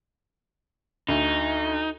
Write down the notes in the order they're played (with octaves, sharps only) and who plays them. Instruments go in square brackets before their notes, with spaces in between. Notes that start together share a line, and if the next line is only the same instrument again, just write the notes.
[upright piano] D2 [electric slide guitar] D#4